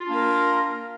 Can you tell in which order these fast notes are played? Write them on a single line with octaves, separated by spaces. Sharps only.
F4 D4 A#3 A#4